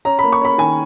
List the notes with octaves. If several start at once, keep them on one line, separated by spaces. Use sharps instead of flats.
C#4 A#5
A#3 B5
C#6
C#4 B5
D#3 G#5